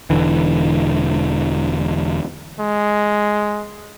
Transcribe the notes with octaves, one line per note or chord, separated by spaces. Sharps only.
E1 D3 E3
G#3